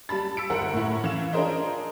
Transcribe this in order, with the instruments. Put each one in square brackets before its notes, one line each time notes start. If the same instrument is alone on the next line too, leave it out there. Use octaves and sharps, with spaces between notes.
[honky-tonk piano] G3 A5 B5 A6
E6 B6 C#7 D7
G1 A#4 F#5
A2 E4
E3 F5 E7
D4 F4 G#4 A#4 C5 D#5